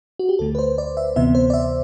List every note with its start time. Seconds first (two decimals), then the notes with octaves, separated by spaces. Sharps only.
0.19 F#4
0.29 G4
0.39 D2 D3 A3 A4
0.55 B4
0.59 C5
0.78 D5
0.97 E5
1.16 D2 C3 E3 B3 E5
1.35 C5
1.50 D5
1.54 E5